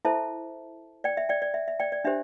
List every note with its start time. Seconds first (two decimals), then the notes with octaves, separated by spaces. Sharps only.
0.05 E4 A4 C5 E5 A5
1.04 D5 G5
1.17 E5
1.29 D5 G5
1.42 D5
1.54 E5
1.68 E5
1.80 D5 G5
1.92 D5
2.05 D4 G4 C5 E5